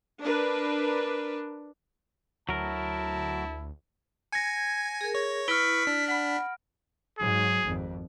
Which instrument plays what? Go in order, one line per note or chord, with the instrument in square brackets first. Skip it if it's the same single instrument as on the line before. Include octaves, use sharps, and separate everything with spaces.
[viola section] D4 A#4 B4
[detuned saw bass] D2 [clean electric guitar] F#3 A#4 [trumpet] E4 [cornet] A5
[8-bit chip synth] G#5 [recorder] G#6 [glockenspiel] A#6 C#7
[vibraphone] G#4 A#4
[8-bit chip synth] C#5
[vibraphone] E4 [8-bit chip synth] B4 C#6 [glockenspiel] F6 D7 [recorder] B6
[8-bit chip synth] D4
[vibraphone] F#5 B5 [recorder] B6
[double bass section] G#2 F#3 [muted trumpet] G#4
[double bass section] G#1 F2